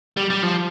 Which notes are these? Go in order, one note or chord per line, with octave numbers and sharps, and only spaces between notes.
G3
G3
F3